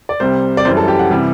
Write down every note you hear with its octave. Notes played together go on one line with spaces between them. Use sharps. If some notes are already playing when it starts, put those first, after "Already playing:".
D5
C2 C3 G3 C5
D5
F#2 E3 G3 C5
A4
G4
F#5
C3 E3 G3